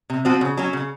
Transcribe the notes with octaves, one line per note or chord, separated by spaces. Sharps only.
C3
F3 C4 F#4
C#3
F#3 C#4 F#4
C#3